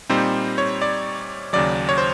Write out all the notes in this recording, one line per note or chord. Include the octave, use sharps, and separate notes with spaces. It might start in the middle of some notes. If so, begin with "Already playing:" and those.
A#2 G3 C4 D#4 C5
C#5
D5
D#2 C#3 F#3 D5
C#5
C5